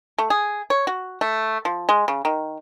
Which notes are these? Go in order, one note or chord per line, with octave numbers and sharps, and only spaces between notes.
A3
G#4
C#5
F#4
A3
F3
G#3
C#3
D#3